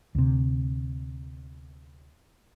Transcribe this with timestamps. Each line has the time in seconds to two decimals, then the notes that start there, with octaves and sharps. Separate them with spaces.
0.15 D2 C3